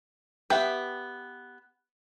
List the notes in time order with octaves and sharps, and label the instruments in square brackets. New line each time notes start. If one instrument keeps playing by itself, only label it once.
[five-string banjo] B3 G5 [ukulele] G4 B4 E5